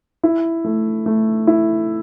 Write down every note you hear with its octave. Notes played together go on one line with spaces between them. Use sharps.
E4
A3
A3
E4